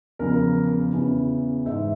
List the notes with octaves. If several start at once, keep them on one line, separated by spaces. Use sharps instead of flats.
E2 C#3 F3 A#4
E2 C#3 E3
G#2 E3 E5